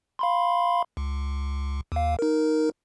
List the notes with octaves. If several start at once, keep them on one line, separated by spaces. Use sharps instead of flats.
F5 B5 C6
C#2
D#2 F5
D#4 A#4